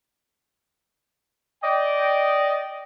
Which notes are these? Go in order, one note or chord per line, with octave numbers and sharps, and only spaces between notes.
D5 D#5 G5